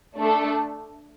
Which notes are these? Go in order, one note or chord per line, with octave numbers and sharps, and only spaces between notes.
A3 D4 A4